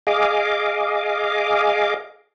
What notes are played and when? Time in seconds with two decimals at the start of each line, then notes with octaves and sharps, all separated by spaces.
0.07 G#4 D#5 F5 D6